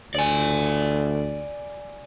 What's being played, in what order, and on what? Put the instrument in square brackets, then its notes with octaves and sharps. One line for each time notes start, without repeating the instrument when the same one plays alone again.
[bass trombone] D2 [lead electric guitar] D5 G#5